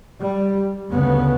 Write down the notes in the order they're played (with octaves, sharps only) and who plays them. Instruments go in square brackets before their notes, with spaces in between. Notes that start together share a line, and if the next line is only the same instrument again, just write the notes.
[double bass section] G3
D2 C#3 B3